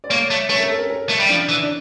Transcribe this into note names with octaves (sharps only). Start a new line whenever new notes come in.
D5
A#3 C#5
A3
A3 C#5
A#4
A4
A#4
A#4
A3
G3
F3 D4
E3
D4